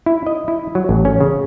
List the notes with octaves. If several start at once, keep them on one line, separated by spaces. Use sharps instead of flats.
E4
D#5
E4
F#3
A1
C#4
C#3